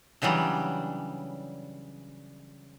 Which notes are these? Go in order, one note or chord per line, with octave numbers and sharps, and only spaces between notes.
C#3 E3 F#3 G3 D4